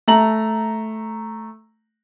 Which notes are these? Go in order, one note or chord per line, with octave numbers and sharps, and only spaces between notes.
A3 A#5 F#7